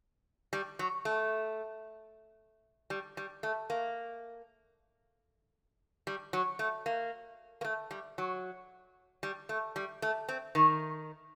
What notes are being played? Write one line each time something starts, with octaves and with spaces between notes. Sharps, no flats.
G3
F#3
A3
G3
G3
A3
A#3
G3
F#3
A3
A#3
A#3
A3
G3
F#3
G3
A3
G3
A3
C4
D#3